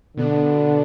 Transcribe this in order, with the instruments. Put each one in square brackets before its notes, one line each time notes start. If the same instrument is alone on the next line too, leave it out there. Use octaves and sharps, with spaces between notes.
[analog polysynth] B2 B3 D4 [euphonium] D3